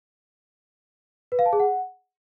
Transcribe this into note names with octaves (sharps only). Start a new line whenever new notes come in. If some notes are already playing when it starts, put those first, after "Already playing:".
B4
F5
A5
G#4
F#5